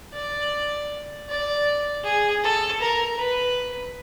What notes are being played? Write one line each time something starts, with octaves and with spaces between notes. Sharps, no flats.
D5
D5
G#4
A4
A#4
B4